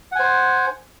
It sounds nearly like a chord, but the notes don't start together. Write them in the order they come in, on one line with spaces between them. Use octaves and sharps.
F#5 G#5 C5